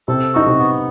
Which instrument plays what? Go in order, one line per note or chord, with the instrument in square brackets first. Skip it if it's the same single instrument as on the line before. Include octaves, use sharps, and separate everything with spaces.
[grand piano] C3 C4 [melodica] A4
[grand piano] D#4 [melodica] F#4
[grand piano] C3 C4
[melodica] B3